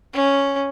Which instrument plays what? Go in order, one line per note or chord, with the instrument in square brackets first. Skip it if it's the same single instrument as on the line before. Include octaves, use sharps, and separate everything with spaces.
[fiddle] C#4